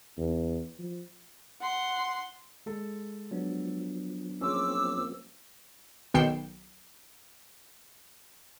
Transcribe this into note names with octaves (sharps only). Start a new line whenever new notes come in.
E2
F3
F#5 C6
G#3 A4
F3 F#3 B3 D4
F3 A#3 C4 C#4 F4 G#4 D6 E6
B1 D#3 G5 C7 C#7 E7